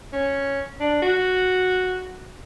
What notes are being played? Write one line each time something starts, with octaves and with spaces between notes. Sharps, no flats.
C#4
D4
F#4